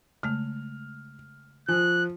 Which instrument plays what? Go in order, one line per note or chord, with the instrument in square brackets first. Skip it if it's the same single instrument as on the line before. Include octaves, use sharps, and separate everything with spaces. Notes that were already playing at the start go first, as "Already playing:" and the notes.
[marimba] C#3 G#3 A3 [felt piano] F6
[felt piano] F3 [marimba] G#5 E6 [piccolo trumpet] F#6